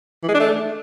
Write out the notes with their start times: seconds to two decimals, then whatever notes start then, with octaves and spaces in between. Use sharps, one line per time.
0.23 E3
0.28 G#3
0.34 D4
0.40 A3